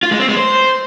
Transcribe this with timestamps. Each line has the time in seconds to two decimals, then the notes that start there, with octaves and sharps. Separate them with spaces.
0.03 F4
0.11 G#3
0.20 C4
0.28 G#3
0.37 C5